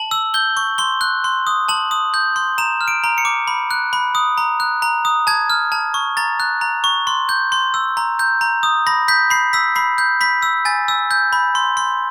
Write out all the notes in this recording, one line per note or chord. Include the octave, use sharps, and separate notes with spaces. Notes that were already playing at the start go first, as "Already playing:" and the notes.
Already playing: A5 F#7
E6
G6 G7
C#6
C6 G7
F#6
C6
D#6
A5 F#7
D#6
G6
C6
A#5 E7
F6
D7
A#5
C#7
D6
B5
F#6
B5
D#6
A#5
F#6
A#5
D#6
A5 G#6
F6
A5
C#6
A#5 A6
F#6
A#5
C#6
C6
G6
C6
E6
A#5
G6
A#5
D#6
B5 A#6
G6 B6
B5 C7
E6 B6
B5 C7
G6
B5 B6
E6
G#5 A6
E6
G6
B5
C6
C6